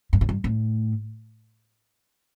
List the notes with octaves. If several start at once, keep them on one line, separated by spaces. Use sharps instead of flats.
G2
A2
G2
A2